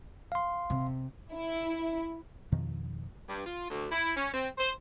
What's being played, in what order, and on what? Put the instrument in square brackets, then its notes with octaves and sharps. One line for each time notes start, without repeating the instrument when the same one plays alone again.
[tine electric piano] F5 C6
[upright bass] C3
[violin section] E4
[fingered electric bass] F2 B2 D#3 F3
[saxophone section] G2
F4
D2
E4
C#4
C4
C5